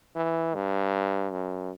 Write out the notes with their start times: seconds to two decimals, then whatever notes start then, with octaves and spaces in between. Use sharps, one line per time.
0.16 E3
0.55 G2
1.31 F#2